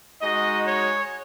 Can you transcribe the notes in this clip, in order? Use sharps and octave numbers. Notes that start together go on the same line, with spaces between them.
G#3 D#4 F#4 D#5
C#5